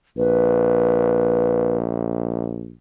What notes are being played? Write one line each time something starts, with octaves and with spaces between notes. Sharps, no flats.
A#1 B4